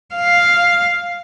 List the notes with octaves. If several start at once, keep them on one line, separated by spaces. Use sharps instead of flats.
F5